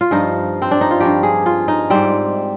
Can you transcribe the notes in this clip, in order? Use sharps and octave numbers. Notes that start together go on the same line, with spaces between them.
F4
G2 F3 D#4
C4
D4
D#4
F4
G2 F3 G4
G#4
F4
D#4
G#2 G3 C4